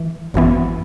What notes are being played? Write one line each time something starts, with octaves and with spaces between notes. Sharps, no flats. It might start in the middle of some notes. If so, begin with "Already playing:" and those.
Already playing: E3
G#1 F#2 E3 B3